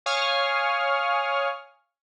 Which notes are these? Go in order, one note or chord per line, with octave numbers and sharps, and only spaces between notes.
C#5 F5 G#5 C#6 D#6 F6